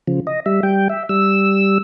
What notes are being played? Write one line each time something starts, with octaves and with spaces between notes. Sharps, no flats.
C#3 F3
D#5
G3 E5
G3 G5
E5
G3 E6